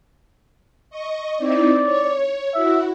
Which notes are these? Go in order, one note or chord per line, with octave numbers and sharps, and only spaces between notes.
D#5 C#6
C4 D#4 E4 D5
C#5
E4 F#4 E5